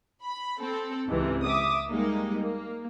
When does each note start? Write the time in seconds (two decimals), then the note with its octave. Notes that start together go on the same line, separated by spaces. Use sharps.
0.21 B5
0.59 C4 A4
1.08 C#2 G#2 C3 E3
1.45 E5 D6 D#6
1.89 G3 G#3 A#3 D#4
2.41 A#3